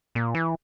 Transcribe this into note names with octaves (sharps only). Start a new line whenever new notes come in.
A#2
E3